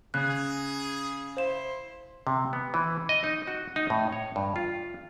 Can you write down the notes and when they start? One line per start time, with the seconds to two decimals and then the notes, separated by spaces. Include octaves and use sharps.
0.14 C#3 G#4 F#6
1.37 E4 C5 F5 C6 E7
2.27 C3
2.53 B3
2.74 E3
3.09 D#5
3.24 D#4
3.47 F#4
3.76 D#4
3.90 A2
4.12 C#5
4.36 G2
4.56 F4